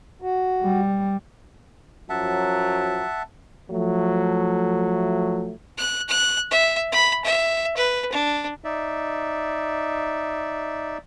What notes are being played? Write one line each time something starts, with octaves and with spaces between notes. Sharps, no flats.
F#4
G3
F#2 F3 F#3 E5 F#5 A5
F3 F#3 A3
F#6
F#6
E5
B5
E5
B4
D4
D#4 D5 E5